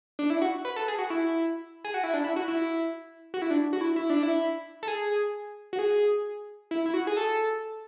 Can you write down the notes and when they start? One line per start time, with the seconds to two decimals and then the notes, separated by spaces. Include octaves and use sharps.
0.19 D4
0.30 E4
0.42 F#4
0.65 B4
0.76 A4
0.88 G#4
0.99 F#4
1.10 E4
1.84 G#4
1.94 F#4
2.04 E4
2.14 D4
2.24 E4
2.36 F#4
2.48 E4
3.34 F#4
3.42 E4
3.51 D4
3.73 F#4
3.81 E4
3.96 E4
4.10 D4
4.23 E4
4.83 A4
4.88 G#4
5.73 F#4
5.79 G#4
6.71 E4
6.86 E4
6.94 F#4
7.07 G#4
7.17 A4